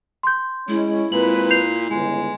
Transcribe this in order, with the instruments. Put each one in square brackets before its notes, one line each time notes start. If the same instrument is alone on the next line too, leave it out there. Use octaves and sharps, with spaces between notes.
[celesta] C6 G6
[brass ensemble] G#3 C#4 [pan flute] E4
[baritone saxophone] A#2 [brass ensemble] G#3 C4 B4 [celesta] F#7
[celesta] G6 C7 F7
[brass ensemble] G1 C#2 [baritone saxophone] G#3